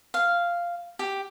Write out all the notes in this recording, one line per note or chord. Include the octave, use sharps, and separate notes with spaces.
F5
G4